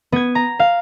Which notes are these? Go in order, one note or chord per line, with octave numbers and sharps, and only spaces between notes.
B3 G#6
A#5
F5